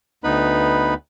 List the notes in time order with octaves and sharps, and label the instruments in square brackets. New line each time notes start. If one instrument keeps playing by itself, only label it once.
[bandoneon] D2 B3 D#4 B4 B5